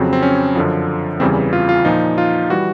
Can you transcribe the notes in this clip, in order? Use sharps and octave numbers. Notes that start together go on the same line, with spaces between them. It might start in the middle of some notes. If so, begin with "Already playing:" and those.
Already playing: F2 C#3 F#3 C4
C4
C#4
F#2 D3 F3
E2 C#3 E3 G3 C4
F4
F4
A#2 F3 D#4
F4
E3 G3 F#4